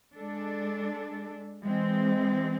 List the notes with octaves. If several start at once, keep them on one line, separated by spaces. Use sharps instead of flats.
G#3 D4 A4
E3 G#3 C4